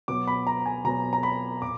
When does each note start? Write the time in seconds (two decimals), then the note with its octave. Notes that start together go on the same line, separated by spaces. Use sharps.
0.08 B2 F#3 B3 D6
0.27 B5
0.47 A#5
0.66 G#5
0.84 B2 F#3 B3 A#5
1.13 A#5
1.23 B5
1.62 A#2 D6